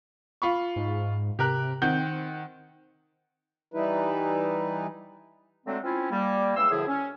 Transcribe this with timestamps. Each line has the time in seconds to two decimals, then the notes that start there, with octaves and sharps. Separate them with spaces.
0.42 F4 B5 C#6
0.76 G#2
1.39 C3 G4 A#4 F#6
1.82 D#3 C4 F#5 G6
3.74 E3 G3 D#4 E4 B4
5.66 D3 F#3 G#3 A3 C4
5.83 C4 C#4 E4 F4
6.11 G3 A#3
6.56 E2 C#3 G#3 C6 E6
6.71 F#2 A2 D3 F3 E4 G#4
6.87 C#4